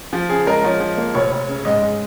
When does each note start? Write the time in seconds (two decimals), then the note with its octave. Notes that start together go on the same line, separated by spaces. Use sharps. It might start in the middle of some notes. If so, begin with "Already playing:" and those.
0.13 F3
0.29 C#3 G#4
0.47 G#3 A#4
0.64 F3 C#5
0.80 F3
0.97 A#3
1.14 F1 C#5
1.31 F1
1.48 C#3
1.65 G#2 D#5
1.82 G#3